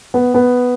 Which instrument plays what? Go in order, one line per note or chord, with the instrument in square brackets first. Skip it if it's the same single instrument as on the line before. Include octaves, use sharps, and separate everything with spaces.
[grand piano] B3
B3